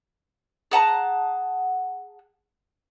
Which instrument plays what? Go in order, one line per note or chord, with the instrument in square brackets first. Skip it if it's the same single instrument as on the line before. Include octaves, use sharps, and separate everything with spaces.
[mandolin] G#4 F#5 A5 A#5